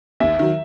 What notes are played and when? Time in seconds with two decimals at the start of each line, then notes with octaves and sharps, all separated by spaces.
0.20 D#2 E5
0.39 D#3 F#3